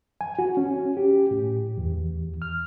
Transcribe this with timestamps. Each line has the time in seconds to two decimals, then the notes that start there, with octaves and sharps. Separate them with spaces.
0.21 G#5
0.39 F#4
0.57 C#4
0.97 G4
1.31 A2
1.78 E2
2.42 F6